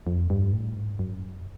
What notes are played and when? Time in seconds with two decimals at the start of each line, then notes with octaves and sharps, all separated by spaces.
0.07 F2
0.30 G2
0.52 A2
0.75 G#2
0.99 F#2